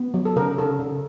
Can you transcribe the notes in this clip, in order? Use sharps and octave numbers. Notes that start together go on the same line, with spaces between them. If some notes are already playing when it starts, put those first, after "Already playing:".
Already playing: B3
F#3
A4
C#3 A#4
C#3 A4
C#3